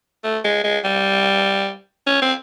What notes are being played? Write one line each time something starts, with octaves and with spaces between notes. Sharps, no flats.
A3
G#3
G#3
G3
C#4
C4